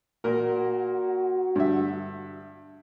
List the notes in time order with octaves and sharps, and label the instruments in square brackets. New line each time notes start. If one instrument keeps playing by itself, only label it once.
[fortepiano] A#2 A#4 [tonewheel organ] F#4
[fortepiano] G2 D3 E5